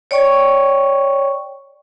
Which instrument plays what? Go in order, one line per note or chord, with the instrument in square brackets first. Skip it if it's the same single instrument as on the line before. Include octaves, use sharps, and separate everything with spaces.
[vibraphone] C#5 D5 G5 C#6